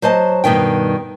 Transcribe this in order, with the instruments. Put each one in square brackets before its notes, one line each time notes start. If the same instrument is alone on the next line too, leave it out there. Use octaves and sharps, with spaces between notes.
[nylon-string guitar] F#3 C5 D#5 A5
G2 B2 D#3 G5